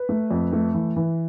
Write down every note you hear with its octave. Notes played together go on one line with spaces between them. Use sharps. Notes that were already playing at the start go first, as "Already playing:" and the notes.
Already playing: B4
A3
F2
A3
E3
E3